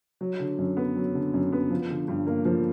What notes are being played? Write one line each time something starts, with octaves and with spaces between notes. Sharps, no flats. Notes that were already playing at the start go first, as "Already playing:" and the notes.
F#3
D3
F#2
B3
F#3
D3
F#2
B3
F3
D3
G2
A#3
F3